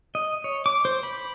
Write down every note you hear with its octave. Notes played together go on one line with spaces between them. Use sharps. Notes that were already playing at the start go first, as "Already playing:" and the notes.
D#5
C#5
D6
C5
B5